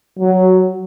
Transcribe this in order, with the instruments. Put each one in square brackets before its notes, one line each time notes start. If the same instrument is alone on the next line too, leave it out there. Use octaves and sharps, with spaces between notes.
[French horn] F#3